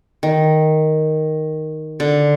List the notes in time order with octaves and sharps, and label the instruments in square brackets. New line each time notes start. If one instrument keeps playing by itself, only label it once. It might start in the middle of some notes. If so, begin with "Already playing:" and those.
[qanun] D#3
D3